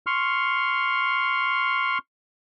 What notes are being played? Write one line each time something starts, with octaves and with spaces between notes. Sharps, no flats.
C6 C#6 F6